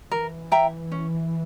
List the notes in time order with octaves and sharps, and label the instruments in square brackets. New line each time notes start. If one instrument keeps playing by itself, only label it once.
[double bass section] E3 [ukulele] A#4
[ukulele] E5 G5 A#5
C#4